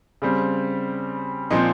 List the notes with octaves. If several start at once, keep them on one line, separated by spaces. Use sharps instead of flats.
C#3 G3 C4
A#2 F3 C4 D#4